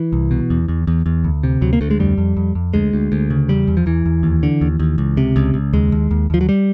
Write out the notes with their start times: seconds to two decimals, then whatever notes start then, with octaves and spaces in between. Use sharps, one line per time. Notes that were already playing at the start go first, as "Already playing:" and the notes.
Already playing: E3
0.13 C2
0.31 B2
0.50 E2
0.68 E2
0.87 E2
1.06 E2
1.24 D2
1.43 C3
1.61 D2 F#3
1.73 A#3
1.81 D2 A3
1.91 G#3
2.00 F2 G3
2.18 F2
2.37 F2
2.55 F2
2.74 D2 G#3
2.93 D2
3.12 D2
3.30 C#3
3.48 E2 G3
3.68 E2
3.77 F3
3.86 E2 E3
4.06 E2
4.23 D#2
4.43 D3
4.61 D#2
4.79 D#2
4.98 C#2
5.17 C3
5.36 C#2
5.54 C#2
5.73 D#2 G#3
5.92 D#2
6.11 D#2
6.30 D#2 F3
6.41 F#3
6.49 G3